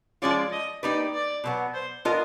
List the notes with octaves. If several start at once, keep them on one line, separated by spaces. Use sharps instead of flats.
F3 G#3 C#4 F4 D5
D#5
A#3 D#4 G4 B4 D5
D5
B2 F#3 B3
C5
B3 D4 F4 A#4 D#5